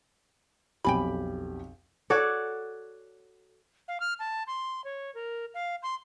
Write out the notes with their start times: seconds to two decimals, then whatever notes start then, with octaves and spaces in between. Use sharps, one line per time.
0.85 B1 F2 G4 G5 G#5 B5
2.10 F#4 A4 C#5 D5
3.88 F5
4.00 F6
4.19 A5
4.47 C6
4.84 C#5
5.15 A#4
5.54 F5
5.83 C6